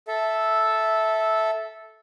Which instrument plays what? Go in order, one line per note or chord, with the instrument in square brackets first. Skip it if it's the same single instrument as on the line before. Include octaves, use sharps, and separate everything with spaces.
[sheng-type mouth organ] A4 E5